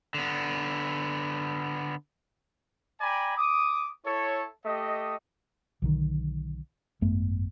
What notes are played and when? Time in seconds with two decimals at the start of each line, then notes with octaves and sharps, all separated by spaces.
0.14 D3 B3
3.00 D5 G5 G#5 A#5 B5
3.35 D6 D#6
4.04 E4 A4 C#5
4.65 A3 G4 D#5
5.82 B1 D3 D#3
7.01 G#1 F#2 A3 B3